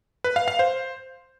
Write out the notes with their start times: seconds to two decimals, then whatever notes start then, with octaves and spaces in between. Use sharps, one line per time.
0.24 B4
0.36 F5
0.48 F5
0.59 C5